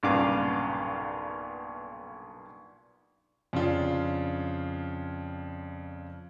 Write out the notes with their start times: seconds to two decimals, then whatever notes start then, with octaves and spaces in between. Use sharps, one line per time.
0.03 B1 G2 A#2 C#3 F5 D6
3.53 F2 C#3 D4 F4